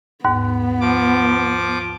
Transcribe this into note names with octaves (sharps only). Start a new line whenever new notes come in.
D#2 G#2 B3
F3 D6